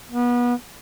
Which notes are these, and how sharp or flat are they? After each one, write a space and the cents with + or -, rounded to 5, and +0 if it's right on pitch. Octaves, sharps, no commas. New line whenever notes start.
B3 -25